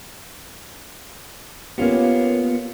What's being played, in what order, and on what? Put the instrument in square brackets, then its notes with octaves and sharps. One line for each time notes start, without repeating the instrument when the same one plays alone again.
[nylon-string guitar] A#3 C#4 G4 [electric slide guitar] B3 F4